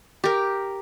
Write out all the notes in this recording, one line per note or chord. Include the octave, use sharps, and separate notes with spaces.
G4 A#4